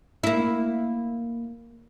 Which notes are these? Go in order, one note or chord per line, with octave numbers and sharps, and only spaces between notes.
A#3 E4